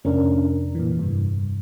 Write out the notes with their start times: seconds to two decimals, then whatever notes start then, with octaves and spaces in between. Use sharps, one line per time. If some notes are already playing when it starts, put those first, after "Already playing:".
0.05 F1 C#4 D4 A#4
0.75 A#2 E3
0.99 G2 C3